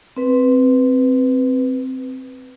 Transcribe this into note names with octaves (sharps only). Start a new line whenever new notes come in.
C4 B4